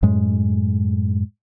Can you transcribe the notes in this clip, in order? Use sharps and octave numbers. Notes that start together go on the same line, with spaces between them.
F#2 A2 G#3